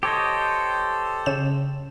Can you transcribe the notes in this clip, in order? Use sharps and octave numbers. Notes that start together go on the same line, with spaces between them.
G4 A4 C5 C#5 D#5
C#3 E7